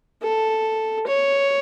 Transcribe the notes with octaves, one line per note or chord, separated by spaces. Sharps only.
A4
C#5